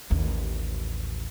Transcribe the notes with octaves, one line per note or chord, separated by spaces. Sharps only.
A1 D#2